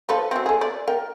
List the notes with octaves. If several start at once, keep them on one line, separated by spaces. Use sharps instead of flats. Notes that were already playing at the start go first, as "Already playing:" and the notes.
F3 A4 B4
F#3 C4
G#4 A4
D5
A#4 G5